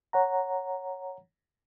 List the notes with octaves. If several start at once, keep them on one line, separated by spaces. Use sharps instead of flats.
C#5 F#5 A#5